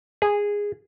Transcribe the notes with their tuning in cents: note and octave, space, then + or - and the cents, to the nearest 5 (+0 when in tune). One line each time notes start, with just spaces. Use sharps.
G#4 -15